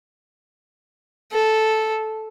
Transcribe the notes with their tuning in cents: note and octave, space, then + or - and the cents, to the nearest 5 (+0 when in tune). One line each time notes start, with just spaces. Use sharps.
A4 -5